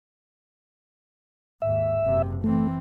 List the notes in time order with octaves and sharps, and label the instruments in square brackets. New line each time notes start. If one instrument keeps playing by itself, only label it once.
[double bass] D#2 G#2 [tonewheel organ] E5
[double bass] F#1 C3
[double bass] E3 C4 [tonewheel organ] A3